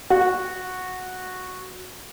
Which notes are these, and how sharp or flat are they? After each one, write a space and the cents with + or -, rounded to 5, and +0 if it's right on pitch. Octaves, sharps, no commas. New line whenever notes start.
F#4 -10